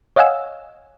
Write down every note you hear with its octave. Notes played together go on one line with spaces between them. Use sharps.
C#5 D#5 F5 F#5 G#5 E6